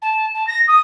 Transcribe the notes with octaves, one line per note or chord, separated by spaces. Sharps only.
A5
A5
A#6
D#6